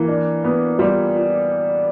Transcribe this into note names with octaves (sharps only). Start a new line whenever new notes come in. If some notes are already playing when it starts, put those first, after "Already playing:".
Already playing: E3 A#3 E4
D4
B3
G3 F4